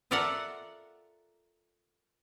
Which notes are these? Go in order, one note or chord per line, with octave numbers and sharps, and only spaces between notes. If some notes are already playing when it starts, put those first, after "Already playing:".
F4 A4 A#4 D5 E5 F#5